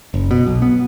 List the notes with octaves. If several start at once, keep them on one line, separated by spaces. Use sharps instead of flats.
F#1
B2
B1
B3